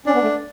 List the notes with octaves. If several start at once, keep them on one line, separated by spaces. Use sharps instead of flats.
C#4 D4
B3
A3